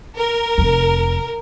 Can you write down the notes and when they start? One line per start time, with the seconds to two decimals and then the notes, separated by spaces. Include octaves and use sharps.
0.18 A#4
0.58 F1 F2